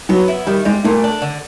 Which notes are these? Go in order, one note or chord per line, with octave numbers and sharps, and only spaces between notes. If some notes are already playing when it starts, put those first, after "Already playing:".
F#3 B3
E4
D#3 G3
G3 G#3
A#2 A3
D4
D3